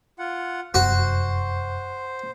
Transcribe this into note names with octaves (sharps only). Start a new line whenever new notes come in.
F4 F#5
F1 F#2 B3 F#4 C5